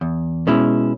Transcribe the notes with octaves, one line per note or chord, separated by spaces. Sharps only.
E2
B2 G#3 C#4 E4